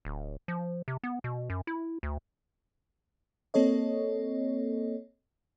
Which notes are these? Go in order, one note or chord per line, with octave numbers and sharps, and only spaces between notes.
D1
F3
C3
B3
B2
F#2
E4
D2
A#3 C4 A4 C#5 D#5